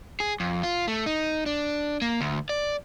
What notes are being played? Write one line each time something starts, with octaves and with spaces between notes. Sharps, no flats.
G#4
F2
F4
A3
D#4
D4
A#3
D2
D5